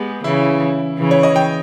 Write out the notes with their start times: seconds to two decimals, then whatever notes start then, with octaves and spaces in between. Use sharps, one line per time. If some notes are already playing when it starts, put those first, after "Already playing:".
Already playing: G#3 B3 G4 G#4
0.24 C#3 E3 E4
0.98 C#3 E3
1.11 C#5
1.23 D#5
1.36 G5